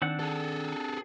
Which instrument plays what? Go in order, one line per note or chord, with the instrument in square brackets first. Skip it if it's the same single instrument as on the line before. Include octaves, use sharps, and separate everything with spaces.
[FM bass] D#3 [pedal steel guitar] C4 D4 F#5
[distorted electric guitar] G#4 A4